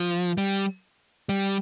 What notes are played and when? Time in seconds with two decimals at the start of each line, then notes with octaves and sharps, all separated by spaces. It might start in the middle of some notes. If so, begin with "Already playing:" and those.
Already playing: F3
0.38 G3
1.29 G3